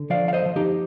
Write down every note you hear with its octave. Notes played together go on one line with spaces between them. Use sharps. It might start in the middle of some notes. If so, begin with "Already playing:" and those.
Already playing: D3
F3 D5 F5
F5
C5 D#5
F3
D#4 G4